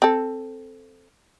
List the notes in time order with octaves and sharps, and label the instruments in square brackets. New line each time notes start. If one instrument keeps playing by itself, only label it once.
[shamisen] C4 A4